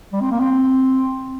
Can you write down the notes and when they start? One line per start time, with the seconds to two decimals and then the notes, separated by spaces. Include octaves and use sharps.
0.13 G3
0.21 C4
0.31 A#3
0.40 C4